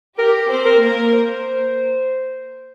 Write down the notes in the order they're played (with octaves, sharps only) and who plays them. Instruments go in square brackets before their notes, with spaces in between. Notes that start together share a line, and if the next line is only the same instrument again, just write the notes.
[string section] G4 [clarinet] A#4
[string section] C4 C5
[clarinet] A#4
[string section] A#3 A#4
[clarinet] C5